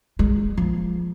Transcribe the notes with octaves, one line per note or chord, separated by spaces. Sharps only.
G#3
F3